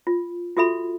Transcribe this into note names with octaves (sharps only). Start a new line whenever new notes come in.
F4
F4 F#4 A4 E5 B5